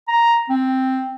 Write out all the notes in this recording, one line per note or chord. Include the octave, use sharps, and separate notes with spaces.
A#5
C4